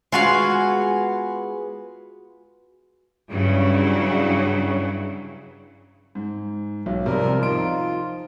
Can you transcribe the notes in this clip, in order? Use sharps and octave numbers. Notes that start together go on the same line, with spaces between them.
G#3 B3 F4 F#4 F5 G#5
G2 C#3 F#3 E4
G#2
B1
C3 F3 G3 A#4
F3 D#4 F4 D7